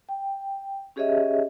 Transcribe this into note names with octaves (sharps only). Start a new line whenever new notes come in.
G5
C#4 G4 G#4 C#5 D#5 E5